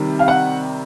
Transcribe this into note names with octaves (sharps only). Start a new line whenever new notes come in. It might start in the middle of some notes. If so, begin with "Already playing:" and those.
Already playing: C3 D#3 G3
F5
F#5